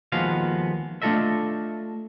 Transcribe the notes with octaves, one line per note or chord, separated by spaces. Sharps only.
D#2 F3 G#3 B3 F#4 F5
A3 D4 F4 A4 D#5 E5